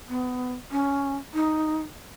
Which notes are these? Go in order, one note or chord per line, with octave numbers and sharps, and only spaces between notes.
B3
C#4
D#4